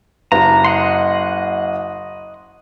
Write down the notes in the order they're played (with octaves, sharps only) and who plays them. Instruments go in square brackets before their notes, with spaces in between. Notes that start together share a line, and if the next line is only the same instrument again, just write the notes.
[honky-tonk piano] F#1 [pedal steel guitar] A#5
[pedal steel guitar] D#5 F#5 C6